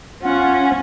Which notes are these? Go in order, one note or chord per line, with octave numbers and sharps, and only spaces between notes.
C#4 F4 F#5